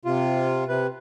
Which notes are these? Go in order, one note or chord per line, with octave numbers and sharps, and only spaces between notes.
C3 F4
C3 B4